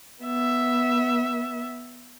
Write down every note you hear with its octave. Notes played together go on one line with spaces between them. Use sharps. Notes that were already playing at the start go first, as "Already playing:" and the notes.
B3 E5